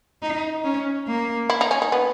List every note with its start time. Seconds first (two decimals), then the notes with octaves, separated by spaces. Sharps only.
0.22 D#4
0.64 C#4
1.07 A#3
1.50 E4
1.61 D#4
1.71 C#4
1.82 D#4
1.92 B3